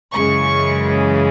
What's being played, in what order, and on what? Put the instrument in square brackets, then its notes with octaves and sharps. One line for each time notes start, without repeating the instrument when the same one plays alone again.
[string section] F#2 C#3 E3 G#3 C#6